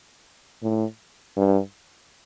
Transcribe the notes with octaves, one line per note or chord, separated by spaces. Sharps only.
A2
G2